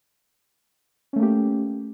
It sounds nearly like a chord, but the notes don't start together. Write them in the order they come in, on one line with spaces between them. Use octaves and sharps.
C#4 A3 A#3 G4